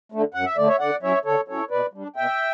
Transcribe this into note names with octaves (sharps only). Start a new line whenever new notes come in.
D3 A3
F#2 F#5
E5
D3 A3 D5
C#5 E5
D3 D5 F#5
F#3 C#4 E4 C#5 E5
D3 A4 C#5
F#3 C#4 E4 A4 C#5
B2 B4 D5
G3 D4
B2 E5 G5